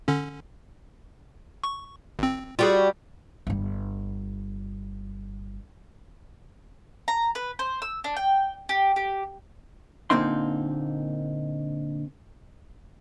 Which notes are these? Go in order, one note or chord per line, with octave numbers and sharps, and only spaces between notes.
D3 C#4
C#6
G#1 C4
G3 F4 F#4 G#4
G1 G3
A#5
B4
C5
E6
D4
G5
G4
G4
A#2 D3 A#3 C4 D#4 C6